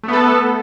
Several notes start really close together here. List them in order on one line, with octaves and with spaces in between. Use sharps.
A3 B3 A4